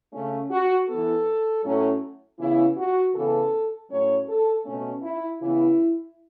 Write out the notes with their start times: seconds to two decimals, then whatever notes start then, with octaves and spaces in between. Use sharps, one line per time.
0.13 C#3 A3 C#4
0.50 F#4
0.88 E3 B3 A4
1.64 A2 F#3 A3 C#4
2.38 C#3 E3 B3 E4
2.77 F#4
3.14 C#3 E3 B3 A4
3.90 A2 F#3 A3 C#4 C#5
4.27 A4
4.65 B2 A3 C#4
5.03 E4
5.41 C#3 E3 B3 E4